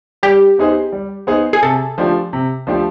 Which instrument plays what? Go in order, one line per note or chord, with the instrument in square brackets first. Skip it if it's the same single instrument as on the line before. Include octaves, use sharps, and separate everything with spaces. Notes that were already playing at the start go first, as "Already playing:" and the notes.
[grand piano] G3 [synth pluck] G4
[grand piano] B3 D#4 G#4 C5
G3
B3 D#4 G#4 C5
[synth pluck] G#4
[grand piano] C3 [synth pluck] A4
[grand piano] F3 A3 D4 G4
C3
F3 A3 D4 G4